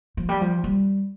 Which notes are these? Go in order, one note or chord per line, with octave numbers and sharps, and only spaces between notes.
F3
G3
F3
G3